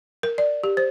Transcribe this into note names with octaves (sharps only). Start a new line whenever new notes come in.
A#4
D5
G4
C5